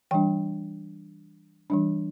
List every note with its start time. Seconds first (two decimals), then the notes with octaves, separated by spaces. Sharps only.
0.11 E3 G3 D4 G5
1.70 E3 G3 D4